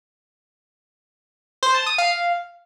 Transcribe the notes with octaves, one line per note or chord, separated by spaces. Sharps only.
C5
A5
D#6
F5